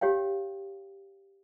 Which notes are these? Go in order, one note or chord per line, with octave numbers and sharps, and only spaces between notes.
G4 C#5 F5 G5